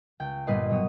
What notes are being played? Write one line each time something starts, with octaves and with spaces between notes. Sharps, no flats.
C#2 G5
G1 G2 A#2 B4 D#5 C6
B2 F#3 C#5 D#6